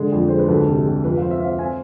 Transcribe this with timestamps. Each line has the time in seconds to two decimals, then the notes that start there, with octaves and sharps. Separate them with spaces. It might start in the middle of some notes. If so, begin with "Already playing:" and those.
Already playing: D3 G#3
0.12 F2
0.28 G#3 C5
0.38 B4
0.48 D2 A4
0.67 C3
0.85 C3
1.04 F2 B4
1.17 F5
1.22 C4
1.31 E5
1.40 C4 F5
1.58 C4 G#5